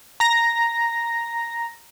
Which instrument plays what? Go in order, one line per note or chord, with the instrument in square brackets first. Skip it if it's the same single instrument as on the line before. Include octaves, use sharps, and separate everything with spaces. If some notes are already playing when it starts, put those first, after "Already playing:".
[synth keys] A#5 A#6